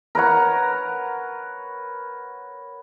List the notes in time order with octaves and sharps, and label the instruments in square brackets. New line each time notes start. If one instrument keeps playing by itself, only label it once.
[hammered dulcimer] A#4 B4 C#5 F#5